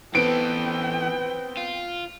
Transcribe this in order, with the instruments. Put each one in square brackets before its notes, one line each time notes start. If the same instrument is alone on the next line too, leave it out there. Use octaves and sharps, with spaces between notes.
[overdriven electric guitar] E3 A4 [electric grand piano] B3 C4 B4 [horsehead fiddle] G5 [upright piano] D7
[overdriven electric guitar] F4